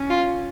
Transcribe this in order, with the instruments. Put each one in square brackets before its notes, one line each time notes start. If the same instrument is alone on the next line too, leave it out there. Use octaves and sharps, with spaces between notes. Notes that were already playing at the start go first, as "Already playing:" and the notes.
Already playing: [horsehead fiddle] C#4
[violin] F4